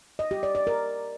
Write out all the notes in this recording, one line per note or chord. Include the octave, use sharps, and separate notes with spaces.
D#5
G4
D5
D5
A#4